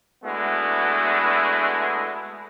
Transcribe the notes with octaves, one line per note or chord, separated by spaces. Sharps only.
G#3 A3 B3 D4 E4 F#4